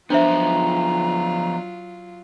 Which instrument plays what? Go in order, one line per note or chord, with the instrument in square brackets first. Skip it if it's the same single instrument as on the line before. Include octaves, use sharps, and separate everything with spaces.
[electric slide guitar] F3 B3 [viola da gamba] F#3 F4 [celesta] D4 C5 E5 [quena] A#5